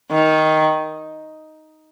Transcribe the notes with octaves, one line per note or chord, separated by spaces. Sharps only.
D#3